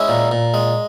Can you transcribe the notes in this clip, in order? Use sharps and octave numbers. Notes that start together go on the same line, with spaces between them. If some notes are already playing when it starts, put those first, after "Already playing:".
Already playing: G#3 C#4 E4
A#2
A#2
G#3